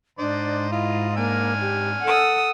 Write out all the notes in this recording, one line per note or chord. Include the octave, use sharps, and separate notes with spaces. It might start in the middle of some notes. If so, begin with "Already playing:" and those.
G#2 D4 C5 D5 D#5
E4 F4 D#5
A#3 D4 G#5 F6
G4
A4 F#5 D#6 E6